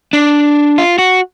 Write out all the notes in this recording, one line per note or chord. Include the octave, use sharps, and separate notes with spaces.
D4
F4
F#4